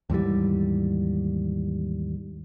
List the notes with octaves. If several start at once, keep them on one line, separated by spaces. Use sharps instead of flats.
D#2 G#2 E3 G3